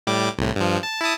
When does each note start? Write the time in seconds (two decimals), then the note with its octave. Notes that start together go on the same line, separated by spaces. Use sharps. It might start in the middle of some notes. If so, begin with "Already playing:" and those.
0.07 A2 G3 D6
0.38 C2 A2
0.56 G2 F3
0.83 A5
1.01 E4 A5 D#6